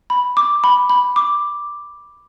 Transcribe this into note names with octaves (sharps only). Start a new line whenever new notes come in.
B5
D6
B5
B5
D6